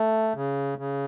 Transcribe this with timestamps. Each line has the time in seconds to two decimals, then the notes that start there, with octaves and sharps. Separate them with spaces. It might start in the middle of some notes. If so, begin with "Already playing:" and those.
Already playing: A3
0.35 C#3
0.78 C#3